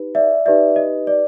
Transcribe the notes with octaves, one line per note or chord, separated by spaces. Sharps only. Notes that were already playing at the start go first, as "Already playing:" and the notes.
Already playing: D#4 G4 B4
D5 E5
D#4 G4 B4 D5 E5
D#5
D5